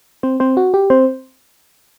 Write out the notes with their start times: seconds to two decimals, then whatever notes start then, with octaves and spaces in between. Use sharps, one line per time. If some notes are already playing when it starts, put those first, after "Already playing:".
0.23 C4 C5
0.40 C4 C5
0.57 F#4
0.74 G4
0.90 C4 C5